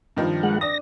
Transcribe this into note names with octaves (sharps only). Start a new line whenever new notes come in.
G2 D#3 F3
G#3 F#5
D4 D#6 A#6